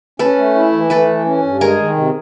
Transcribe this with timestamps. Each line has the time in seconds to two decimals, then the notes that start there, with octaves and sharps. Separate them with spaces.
0.19 C#4 A4 B4
0.38 A3
0.55 E4
0.73 E3
0.90 A3 A4 B4
1.08 E3
1.25 C#4
1.43 G2
1.60 G#3 G#4 A#4
1.79 D#3
1.96 C3